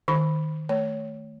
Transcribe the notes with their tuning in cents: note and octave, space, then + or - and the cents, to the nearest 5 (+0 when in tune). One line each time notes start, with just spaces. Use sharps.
D#3 +0 B5 +0
A3 +0 C#5 +15